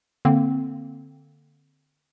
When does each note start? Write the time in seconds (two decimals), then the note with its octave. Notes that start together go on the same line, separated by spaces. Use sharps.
0.25 D3 A#3 C4